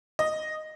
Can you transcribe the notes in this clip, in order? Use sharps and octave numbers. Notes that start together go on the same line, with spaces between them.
D#5